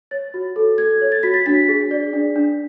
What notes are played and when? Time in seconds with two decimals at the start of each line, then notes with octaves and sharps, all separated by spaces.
0.11 C#5 A6
0.34 F#4
0.56 A4
0.78 A4 G#6
1.01 C#5
1.12 A6
1.23 F#4 B6
1.34 A6
1.46 D4 B6
1.68 G#4
1.91 D5
2.13 D4
2.36 D4